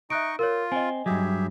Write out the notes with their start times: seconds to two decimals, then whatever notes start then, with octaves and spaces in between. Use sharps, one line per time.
0.10 D#4 D#5 E5 C#6 F#6 D7
0.39 F4 A#4 C#5
0.72 C4 D#5 G#5
1.06 G2 F#3 G4 G#4 E5